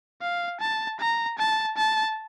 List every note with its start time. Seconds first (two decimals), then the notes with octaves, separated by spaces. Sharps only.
0.21 F5
0.60 A5
1.00 A#5
1.38 A5
1.77 A5